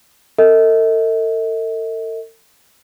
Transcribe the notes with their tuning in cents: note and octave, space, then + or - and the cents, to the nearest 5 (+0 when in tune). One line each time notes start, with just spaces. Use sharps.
A4 +45 D#5 +40